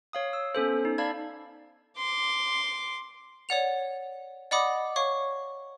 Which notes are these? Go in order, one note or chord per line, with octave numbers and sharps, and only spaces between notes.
C#5 F5 D#6
E6
B3 C#4 A4 C5
D#4
D5 F5 A5 B5 G#6
C6 D6
C#5 D5 F#5 F7
D5 D#5 F#5 B5 D6 D#6
C#5 F5 C#6